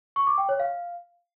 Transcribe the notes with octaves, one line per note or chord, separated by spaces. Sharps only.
C#6
D6
G5
C#5
F5